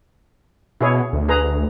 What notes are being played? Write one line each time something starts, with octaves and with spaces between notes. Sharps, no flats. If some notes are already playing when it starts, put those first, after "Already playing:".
B2 E4 G#4 C#5
D2
G#4 B4 A#5